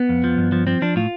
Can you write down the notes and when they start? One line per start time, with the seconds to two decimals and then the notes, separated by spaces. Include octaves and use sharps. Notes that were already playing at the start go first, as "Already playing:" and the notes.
Already playing: B3
0.09 F2
0.24 F3
0.38 G2
0.52 F3
0.67 F3 C4
0.82 F3 D4
0.96 A2 F4